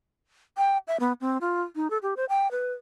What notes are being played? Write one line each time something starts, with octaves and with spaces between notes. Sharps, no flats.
G5
E5
B3
C4
F4
D#4
A4
G4
C5
G5
B4